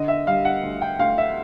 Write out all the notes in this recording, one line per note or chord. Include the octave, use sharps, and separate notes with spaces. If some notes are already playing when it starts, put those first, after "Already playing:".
Already playing: D3 D#5
E5
G3 F5
F#5
D2
G5
D2 F5
E5